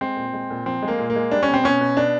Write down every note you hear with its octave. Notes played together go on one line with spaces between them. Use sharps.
G#3 C4
A#2
G#3
A#2
F3 C4
G#3
A#3
A#2
A#3
G#3
G3 D4
C#4
B2
C4
B2 C#4
B2
B2 D4